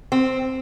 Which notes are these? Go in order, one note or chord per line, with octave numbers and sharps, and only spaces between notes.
C4